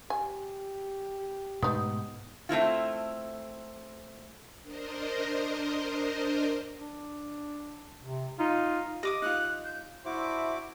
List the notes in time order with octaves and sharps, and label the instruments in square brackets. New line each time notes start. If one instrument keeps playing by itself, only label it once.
[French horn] G4 [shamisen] G#5
[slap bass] G#2 B2 A3 [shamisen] B3 D#4
[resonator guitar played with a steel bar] A3 C4 E4 F4
[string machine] D4 A#4 C5 D#5
[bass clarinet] D4
C3
[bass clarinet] D#4 [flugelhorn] F4
[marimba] G4 [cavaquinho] D#5 D6 D#6
[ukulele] D#4 F4 [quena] F#6
[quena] G6
[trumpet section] D4 C5 E5 [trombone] E4 [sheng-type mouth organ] F#4 D6